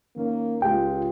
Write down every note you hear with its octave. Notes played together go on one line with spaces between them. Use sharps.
D#3 A#3 C#4
C#2 G#3 F4 G4 G5